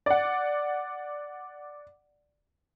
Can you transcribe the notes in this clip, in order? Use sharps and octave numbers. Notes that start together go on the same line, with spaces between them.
D5 F#5